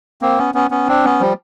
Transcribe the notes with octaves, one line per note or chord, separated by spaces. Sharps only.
A#3 C4
B3 C#4
B3 C#4
B3 C#4
C4 D4
B3 C#4
F3 G3